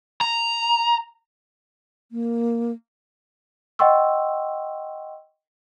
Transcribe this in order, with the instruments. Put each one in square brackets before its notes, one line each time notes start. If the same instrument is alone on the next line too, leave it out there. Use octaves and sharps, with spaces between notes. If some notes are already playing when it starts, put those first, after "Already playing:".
[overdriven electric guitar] A#5
[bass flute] A#3
[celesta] D#5 F#5 G5 C6 C#6 E6